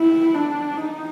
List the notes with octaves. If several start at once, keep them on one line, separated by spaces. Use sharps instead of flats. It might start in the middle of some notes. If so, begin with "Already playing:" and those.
Already playing: E4
D4
D#4